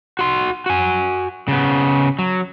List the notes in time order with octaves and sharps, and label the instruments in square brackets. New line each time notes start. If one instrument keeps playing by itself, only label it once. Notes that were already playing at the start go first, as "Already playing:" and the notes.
[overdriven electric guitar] F#4 C6
F#4 G#5
C#3 B3
F#3